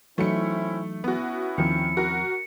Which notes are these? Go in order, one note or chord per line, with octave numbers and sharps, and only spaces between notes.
E3 F#3 A3 C4 C#4 D#4 E4 C#7
B3 C#4 E4 F#4
D#2 D#3 F3 C4 C#7
F#4 A#4